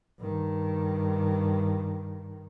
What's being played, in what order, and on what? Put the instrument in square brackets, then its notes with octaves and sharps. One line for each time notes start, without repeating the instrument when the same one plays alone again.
[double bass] G2 D#3